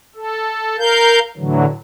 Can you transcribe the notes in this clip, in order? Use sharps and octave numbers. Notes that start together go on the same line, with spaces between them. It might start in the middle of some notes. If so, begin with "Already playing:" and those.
A4
A#4 F5 G6
A2 D3 E3 F#3